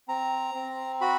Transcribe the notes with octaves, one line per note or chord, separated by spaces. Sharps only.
C4 A#5
C4
F#4 B5